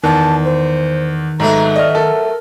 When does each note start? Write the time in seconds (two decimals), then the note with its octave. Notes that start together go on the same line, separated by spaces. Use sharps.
0.04 E2 D#3 A5
0.44 C5
1.40 G#2 F#3 A3 B3 A#5
1.76 D5 D#5 F6
1.95 A4 A#4